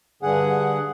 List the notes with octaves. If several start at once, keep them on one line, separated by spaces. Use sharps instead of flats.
G2 D3 G#4 F#5